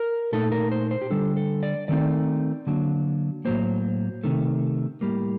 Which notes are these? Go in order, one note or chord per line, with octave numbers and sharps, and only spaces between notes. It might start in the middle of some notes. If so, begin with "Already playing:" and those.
Already playing: A#4
A#2 A3 D#4 A4
A#4
C5
C5
G4
D3 G3 D4 A4
A4
D5
D#3 A3 C4 D#4 D5
D3 F#3 A#3 D4
A2 F#3 A#3 C5
C3 D#3 A3
A2 G3 A#3